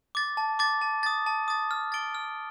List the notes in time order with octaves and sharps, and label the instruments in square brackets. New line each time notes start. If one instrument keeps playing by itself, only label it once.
[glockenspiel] D6 A6
A5
D6 A6
A5
D#6 A6
A5
D#6 A6
F6
A6 D7 G7
F6